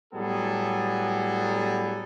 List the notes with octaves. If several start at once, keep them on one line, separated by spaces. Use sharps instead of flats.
A2 F#3 G3 B3 G#4 A4